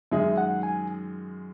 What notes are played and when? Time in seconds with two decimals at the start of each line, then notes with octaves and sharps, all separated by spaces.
0.11 F#2 D#3 G#3 D#4 G#4 E5
0.38 F#5
0.63 G#5